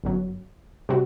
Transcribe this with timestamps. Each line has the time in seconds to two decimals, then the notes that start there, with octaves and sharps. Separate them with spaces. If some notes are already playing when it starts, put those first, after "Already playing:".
0.04 G1 F#2 F#3
0.89 C3 G3 C4 F#4